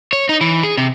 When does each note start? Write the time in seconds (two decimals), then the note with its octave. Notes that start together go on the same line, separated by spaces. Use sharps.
0.13 C#5
0.29 D#4
0.41 E3
0.63 G#4
0.78 C3